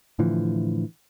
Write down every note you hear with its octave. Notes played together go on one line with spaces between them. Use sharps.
A2 D3 E3 F3